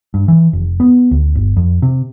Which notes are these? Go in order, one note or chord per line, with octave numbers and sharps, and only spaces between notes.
G2
E3
F1
B3
D2
G1
F2
C3